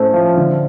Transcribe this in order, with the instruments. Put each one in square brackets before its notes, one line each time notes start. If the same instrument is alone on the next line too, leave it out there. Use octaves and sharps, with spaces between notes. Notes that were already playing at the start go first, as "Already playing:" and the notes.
Already playing: [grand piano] A2 A3 C#4 [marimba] C5
[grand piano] F3
D3